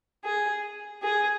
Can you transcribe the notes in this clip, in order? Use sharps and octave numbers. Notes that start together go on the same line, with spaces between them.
G#4
G#4